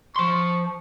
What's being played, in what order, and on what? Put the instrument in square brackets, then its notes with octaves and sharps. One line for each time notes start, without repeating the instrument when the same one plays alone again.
[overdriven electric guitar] F3 C6 [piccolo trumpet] C#6